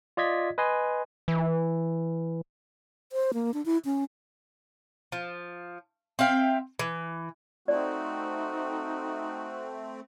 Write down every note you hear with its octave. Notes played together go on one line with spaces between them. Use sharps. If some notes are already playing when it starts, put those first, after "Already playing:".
F4 D5 D#5 G#6 B6
B4 D#5 G#5 C6
E3
C5
A#3
D4
E4
C#4
F3
C4 E5 F5 G5
E3
A3 C4 D#4 F#4 D5